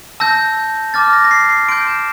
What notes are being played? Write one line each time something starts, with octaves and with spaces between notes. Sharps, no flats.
A5 E6 G6 A#6
A5 D6 F6 A6
A#6
A#6
C7
C7
C6 G6 D7
E7